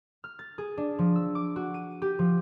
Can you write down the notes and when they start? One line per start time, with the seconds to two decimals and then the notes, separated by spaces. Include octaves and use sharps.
0.24 F6
0.39 A6
0.58 G#4
0.78 D4
0.99 F3
1.16 E6
1.35 D6
1.56 F#4
1.74 D#7
2.02 G4
2.19 F3